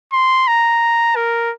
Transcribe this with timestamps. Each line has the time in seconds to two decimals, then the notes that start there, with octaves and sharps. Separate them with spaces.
0.13 C6
0.48 A#5
1.16 A#4